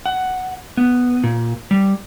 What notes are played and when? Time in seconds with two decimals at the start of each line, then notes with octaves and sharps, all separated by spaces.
0.06 F#5
0.77 B3
1.24 A#2
1.71 G3